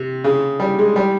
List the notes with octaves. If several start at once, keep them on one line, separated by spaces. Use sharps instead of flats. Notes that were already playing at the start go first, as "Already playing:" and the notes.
Already playing: C3
C#3
G3
G#3
G3